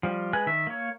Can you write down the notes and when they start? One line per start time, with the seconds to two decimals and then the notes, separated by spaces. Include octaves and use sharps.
0.03 F3 G3
0.33 G#3 B4 G#5 F#6
0.46 D#3 E5
0.67 A#3 C#5